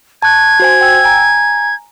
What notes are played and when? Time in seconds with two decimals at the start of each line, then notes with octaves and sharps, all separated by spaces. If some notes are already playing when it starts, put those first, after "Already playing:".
0.22 A5 C#6 F#6 G#6
0.60 F#4 C5 G#5
0.81 G5 E6
1.04 G#5 A#5